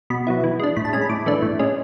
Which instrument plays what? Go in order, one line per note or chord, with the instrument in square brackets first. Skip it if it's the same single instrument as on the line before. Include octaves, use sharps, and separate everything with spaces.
[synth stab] B2 B5
F#3 B3 E4
E3
G#3 D4
A2 B5
A5
G#3 C#4 G#5
B5
A2 D6
E3 A3 D4
A2
G#3 C#4